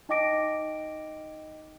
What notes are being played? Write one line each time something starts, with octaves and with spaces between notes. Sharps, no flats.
D#4 D#5 G5 D6 A#6 D7